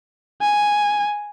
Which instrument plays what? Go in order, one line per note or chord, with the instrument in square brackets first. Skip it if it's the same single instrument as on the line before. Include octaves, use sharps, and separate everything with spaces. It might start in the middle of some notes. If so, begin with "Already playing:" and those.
[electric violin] G#5